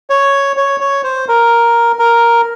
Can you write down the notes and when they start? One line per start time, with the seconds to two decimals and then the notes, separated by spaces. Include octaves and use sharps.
0.10 C#5
0.57 C#5
0.80 C#5
1.04 C5
1.28 A#4
1.99 A#4